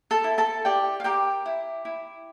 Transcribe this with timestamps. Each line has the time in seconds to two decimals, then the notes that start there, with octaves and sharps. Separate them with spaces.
0.11 A4 A5
0.24 E4
0.38 A4 A5
0.65 G4 D5 G5
1.00 F5
1.04 G4 A#4 G5
1.46 E4
1.85 E4